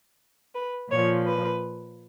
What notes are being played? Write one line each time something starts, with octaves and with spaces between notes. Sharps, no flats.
B4
A#2 F3 C#5
B4